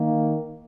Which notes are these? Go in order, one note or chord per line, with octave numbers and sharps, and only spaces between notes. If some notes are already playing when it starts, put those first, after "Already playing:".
Already playing: D#3 A#3